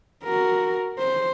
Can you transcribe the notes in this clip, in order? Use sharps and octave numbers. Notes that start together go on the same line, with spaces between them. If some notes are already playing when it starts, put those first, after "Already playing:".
F#4 A#4
C5